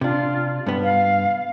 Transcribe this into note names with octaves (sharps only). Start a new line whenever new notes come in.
C3 D4 F4
G2 B3
F5